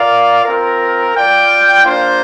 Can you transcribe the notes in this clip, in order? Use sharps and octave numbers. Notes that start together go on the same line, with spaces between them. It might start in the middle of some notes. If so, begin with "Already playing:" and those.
Already playing: F4 A#4 D5 F5
C4 F4 A#4
F4 D5 G5
A#3 D4 F4 C5